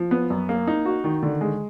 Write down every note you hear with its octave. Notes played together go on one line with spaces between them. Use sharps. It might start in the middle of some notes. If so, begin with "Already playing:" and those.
Already playing: F3
B3
F#2
A#3
D#4
F#4
D#3
D3
G#3